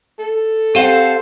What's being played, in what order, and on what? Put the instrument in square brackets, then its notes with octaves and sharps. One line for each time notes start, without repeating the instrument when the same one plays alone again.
[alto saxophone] A4
[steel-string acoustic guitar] C4 F5 F#5 [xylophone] G4 E7 G7 [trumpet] C5